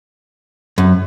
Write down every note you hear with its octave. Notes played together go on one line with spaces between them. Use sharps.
F#2